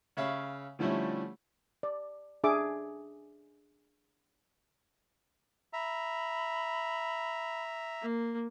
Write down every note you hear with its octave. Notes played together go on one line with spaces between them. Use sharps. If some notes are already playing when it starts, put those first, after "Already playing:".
C#3 C#5 E5 F5 B5
D3 F3 G3 A3 C#4 E4
D5
D4 G#4 E5 D6
E5 A#5 B5
A#3